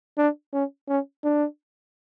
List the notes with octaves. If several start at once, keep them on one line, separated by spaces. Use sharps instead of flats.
D4
C#4
C#4
D4